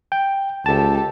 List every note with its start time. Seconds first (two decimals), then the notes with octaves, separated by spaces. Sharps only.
0.12 G5
0.66 C#2 G4 A4 A5